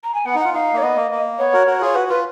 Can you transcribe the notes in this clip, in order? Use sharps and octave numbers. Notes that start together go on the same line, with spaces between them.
A#5
G#5
B3 F#5
D#4
F4 F#5
D#4 F5
A#3 C#5
B3 D#5
A#3
A#3
B3 C#5
F#4 A#4
F#4 A#4
F4 G#4 C#5
F#4 B4
F4 B4